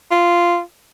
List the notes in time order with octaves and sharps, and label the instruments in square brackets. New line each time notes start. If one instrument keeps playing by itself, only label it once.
[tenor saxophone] F4